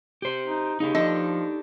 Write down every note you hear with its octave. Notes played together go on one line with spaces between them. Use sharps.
G4 C5
D#4
C#3 D#4 G4
F3 D4 A4 D#5